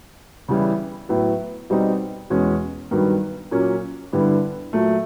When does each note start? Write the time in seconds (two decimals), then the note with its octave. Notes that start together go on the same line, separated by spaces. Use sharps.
0.48 C#3 E3 G3 B3 E4
1.09 A2 F#3 B3
1.70 B2 G3 C4 D#4
2.30 E2 B2 G#3 C#4
2.91 G2 D#3 F#3 B3
3.51 A#2 F#3 A#3 C#4
4.13 G2 D3 G3 B3 E4
4.73 A#2 F#3 A3